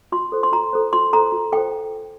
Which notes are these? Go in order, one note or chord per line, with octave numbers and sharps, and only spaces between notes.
F4 C6
A4 C5
C6
F4 A#5
A4 C5
F4 C6
A4 C5 A#5
F4
A4 C5 G5